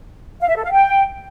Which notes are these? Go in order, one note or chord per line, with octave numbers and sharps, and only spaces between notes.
F5
E5
A4
F5
G5